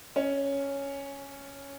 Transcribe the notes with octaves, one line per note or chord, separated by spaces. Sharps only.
C#4